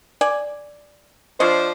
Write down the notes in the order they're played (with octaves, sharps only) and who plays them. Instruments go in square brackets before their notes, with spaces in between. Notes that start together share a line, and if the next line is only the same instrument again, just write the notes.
[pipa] D5 G#5
[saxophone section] F3 D4 C5 [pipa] C#5 D#5